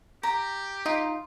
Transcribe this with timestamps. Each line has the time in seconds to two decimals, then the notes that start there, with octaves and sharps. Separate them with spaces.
0.23 G4 A#5
0.86 D#4 F4